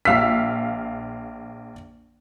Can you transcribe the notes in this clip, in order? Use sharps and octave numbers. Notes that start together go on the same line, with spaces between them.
A#1 F5 E6 B6